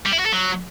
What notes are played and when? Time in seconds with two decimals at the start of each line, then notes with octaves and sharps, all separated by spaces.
0.06 G3
0.13 E4
0.19 F#4
0.26 A4
0.33 F#3